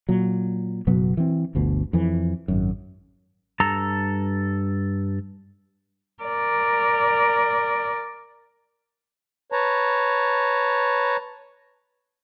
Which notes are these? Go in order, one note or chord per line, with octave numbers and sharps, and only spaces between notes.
A#2 F#3
F#1 B2 F#3 B3
E3 C4
G1 D2 B2
F2 E3
G#1 F#2
G2 A4 A#5
A#4 D5
B4 C#5 A5 A#5